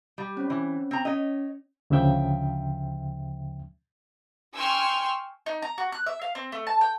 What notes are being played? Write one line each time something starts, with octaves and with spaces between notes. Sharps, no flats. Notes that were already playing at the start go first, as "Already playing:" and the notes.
G3
C4 C#4
E3
C4 A#5
C#4 C#5 D#5
D2 C#3 F3 E5 G5
G5 G#5 C6 C#6 E6 F6
D#4
A#5
F#4
F#6
E5
F5
C4
A3
A5
G5